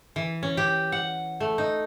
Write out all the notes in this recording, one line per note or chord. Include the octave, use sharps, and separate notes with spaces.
E3
C#4
G4
F#5
A3
D#4